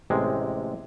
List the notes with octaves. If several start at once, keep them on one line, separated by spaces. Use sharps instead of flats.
A1 C3 G#3